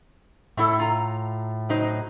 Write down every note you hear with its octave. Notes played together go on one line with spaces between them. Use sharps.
A2 A3 E4 A4
F4 A#5
F#3 D#4 C5